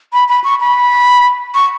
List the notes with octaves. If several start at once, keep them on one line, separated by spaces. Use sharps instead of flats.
B5
B5
C#6
B5
C#6